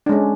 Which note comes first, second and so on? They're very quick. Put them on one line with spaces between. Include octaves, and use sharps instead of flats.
D4 G#3 C#4